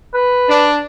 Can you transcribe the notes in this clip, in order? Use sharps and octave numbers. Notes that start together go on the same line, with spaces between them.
B4
D4